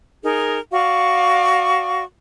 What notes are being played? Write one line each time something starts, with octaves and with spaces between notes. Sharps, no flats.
D#4 G#4 A#4
F#4 D5 F5 C#6